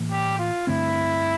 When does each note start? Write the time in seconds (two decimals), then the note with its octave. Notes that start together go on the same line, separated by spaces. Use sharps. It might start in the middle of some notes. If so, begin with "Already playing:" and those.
Already playing: A2 E3 A#3
0.10 G3 G4
0.38 F4
0.67 G2 D3 A3 C4 E4